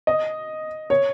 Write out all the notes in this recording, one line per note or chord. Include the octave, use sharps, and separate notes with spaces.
D#5
C#5